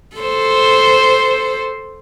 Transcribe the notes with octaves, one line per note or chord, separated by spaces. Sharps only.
A4 C5